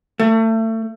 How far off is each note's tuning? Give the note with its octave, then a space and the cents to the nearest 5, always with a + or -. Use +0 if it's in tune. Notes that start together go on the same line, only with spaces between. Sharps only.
A3 +30